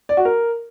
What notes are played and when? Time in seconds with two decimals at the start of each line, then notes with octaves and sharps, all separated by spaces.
0.09 D5
0.17 F#4
0.25 A#4